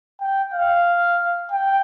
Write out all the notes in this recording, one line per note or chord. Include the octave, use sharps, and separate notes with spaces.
G5
F5
G5